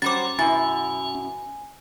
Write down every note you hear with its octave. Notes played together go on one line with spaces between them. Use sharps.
F#3 G3 C#4 C5 D6 A6
F#2 B2 E4 G#5 A6